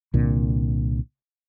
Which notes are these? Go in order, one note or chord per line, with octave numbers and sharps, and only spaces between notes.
C2 A#2 D3